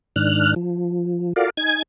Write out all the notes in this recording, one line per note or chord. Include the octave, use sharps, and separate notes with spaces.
G#2 D#3 D4 F6 F#6
F3
F4 F#4 A4 A#4 D5 F5
D#4 G#5 G#6